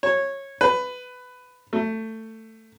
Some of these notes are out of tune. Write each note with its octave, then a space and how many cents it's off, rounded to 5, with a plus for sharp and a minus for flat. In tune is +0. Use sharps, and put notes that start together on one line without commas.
C#5 -15
B4 +15
A3 +15